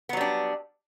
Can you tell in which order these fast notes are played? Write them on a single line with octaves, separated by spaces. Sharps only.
B3 F#3 G3 D4